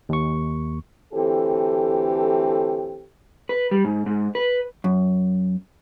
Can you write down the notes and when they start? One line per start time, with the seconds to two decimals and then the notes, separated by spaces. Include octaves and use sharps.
0.09 D#2 C#6
1.14 D2 E3 C4 G4 A4
3.49 B4
3.71 G3
3.84 G#2
4.06 G#2
4.35 B4
4.84 F#2